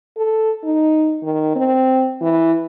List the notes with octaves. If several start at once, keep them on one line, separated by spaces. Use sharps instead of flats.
A4
D#4
D#3
C4
E3